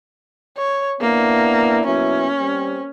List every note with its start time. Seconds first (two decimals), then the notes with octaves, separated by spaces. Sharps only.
0.57 C#5
1.01 A#3 B3 D4 E4
1.86 B2 F#3 C#4 E4
2.39 G3 C4